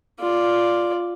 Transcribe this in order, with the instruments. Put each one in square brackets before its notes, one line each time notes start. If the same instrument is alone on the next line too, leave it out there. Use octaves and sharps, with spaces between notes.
[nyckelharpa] F4 D5